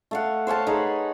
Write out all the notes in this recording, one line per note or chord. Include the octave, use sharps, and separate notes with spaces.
A3 F5 F#5
C5 C#5 F5 A5
D#4 G#4 B4 F#5